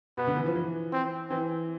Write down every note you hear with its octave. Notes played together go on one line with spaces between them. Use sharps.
B2 B3
D3
E3
F3
E3
C4
E3 C4